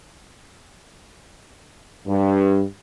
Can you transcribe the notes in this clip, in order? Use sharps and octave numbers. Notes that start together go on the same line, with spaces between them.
G2